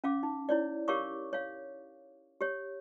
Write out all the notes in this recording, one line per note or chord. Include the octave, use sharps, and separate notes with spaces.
C#4 F5 D6
D#4
E4 C#5 D5
G4 A#4 C#5 F5 C#6 D6
C#5 F5
G4 C#5